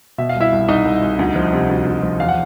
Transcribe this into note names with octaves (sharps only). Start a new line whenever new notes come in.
B2 E5
F5
C2
E4 E5
C2
C2 D#4 D#5
C2
C2
D2
F3
C3
D2
D2
F3
E2 F5
F#5